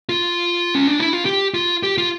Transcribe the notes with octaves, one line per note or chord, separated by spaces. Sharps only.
F4
C#4
D4
E4
F4
G4
F4
G4
F4